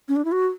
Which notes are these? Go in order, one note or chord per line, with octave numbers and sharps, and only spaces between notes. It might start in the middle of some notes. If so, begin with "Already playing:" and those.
C#4
D4
E4
F#4